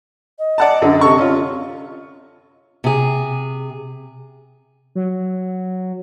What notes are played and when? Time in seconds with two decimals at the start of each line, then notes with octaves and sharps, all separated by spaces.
0.38 D#5
0.58 D5 F#5 A5
0.82 F#2 D3
1.01 C3 A4 C#6
1.18 C#4 F4
2.84 C3 G#4
4.95 F#3